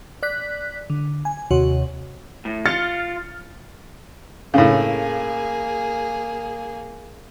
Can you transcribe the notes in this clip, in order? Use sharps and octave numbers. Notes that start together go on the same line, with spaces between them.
D5 F#6 B6
D3
G#5
D#2 C3 F#4 C#5
A2
F4 F6 A6 C#7
A2 C#3 A#3 G#4